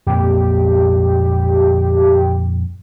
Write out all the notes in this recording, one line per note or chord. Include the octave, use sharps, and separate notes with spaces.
F2 A#2 A#3 G4